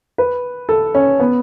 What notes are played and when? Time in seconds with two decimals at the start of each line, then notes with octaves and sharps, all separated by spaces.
0.18 B4
0.69 A4
0.95 C#4
1.20 B3